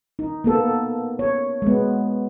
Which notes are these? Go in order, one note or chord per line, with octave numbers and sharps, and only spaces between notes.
D#4
A#3 B3 A4
C#5
G#3 B3